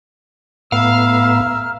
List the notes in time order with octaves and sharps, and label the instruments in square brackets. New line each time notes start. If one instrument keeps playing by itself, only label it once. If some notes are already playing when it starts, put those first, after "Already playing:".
[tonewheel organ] A2 B3 [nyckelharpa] E5 [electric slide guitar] F5 [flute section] A#5 F6